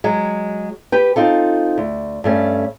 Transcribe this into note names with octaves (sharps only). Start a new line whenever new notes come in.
F#3 G#3
G4 B4 G5
C4 D#4 F4 A4
D2
G2 A3 C#4